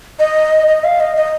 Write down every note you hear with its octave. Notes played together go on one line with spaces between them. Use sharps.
D#5
D#5
F5
D#5
D#5